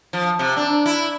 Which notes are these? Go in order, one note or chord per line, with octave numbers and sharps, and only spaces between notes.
F3
C3
D4
E4